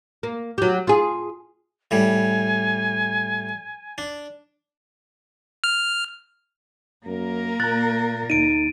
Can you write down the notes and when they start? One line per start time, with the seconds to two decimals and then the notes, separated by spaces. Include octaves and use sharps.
0.23 A#3
0.58 F#3 G4
0.87 F4 G#4
1.91 A2 G3 G#5
3.98 D4
5.64 F6
7.06 F#2 A#3 A#4
7.60 A#2 A#5 F#6 A6
8.30 D2 D#4 D7 D#7